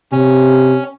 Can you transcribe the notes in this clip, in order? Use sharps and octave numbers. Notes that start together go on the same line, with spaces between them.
C3 C#4